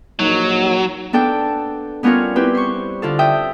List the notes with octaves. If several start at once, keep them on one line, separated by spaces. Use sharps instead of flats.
A#1 F#3 A#3 D#4
B3 D4 A4 G5
G3 B3 C#4 F4 A#4 C#5
C4 E4 G4 B4
C5 C#6
D3 F4 A4
E5 G5 D#6